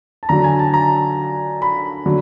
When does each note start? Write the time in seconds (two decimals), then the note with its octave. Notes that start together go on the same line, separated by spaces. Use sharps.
0.23 A5
0.29 D3 F#3 A#5
0.44 G#5
0.59 A5
0.74 A#5
1.62 B5
2.06 D3 F#3